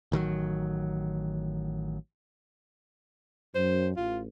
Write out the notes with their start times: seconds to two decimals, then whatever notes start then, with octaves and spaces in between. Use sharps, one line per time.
0.12 A1 D#3 E3 F#3
3.55 F#2 C5
3.97 A1 F4